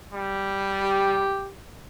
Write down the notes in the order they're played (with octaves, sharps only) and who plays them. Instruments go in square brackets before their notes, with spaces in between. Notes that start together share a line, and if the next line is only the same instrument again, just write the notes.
[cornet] G3
[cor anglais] G4